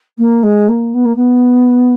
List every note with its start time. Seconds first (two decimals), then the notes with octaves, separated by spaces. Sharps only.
0.18 A#3
0.43 G#3
0.68 A#3
0.93 B3
1.04 A#3
1.16 B3